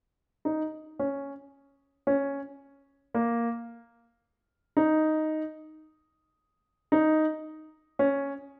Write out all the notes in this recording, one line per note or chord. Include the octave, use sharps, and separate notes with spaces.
D#4
C#4
C#4
A#3
D#4
D#4
C#4